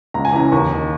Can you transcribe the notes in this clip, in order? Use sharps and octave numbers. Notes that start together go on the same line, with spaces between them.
C#2 A#5
G#5
C#3 E3 A#5
D#2 C#6
D#3